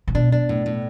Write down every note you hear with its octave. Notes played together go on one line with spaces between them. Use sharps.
A2
B2 D4
D4
A2
A2